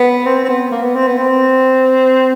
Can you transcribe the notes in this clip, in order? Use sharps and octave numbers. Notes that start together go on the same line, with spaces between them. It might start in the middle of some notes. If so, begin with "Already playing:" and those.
Already playing: B3
C4
C4
B3
A#3
B3
C4
B3
C4